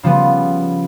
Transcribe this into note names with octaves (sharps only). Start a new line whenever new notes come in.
C#3 F3 G3 B3